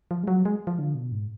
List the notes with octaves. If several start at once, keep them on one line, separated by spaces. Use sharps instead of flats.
F3
G#3
F#3
G#3
F3
D3
B2
G#2